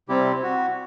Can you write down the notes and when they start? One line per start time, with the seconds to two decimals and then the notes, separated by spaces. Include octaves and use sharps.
0.09 C3 G3 C4 E4 G4
0.43 F#4